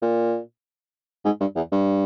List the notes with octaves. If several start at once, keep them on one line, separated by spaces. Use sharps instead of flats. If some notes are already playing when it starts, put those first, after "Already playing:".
A#2
G#2
G2
E2
G2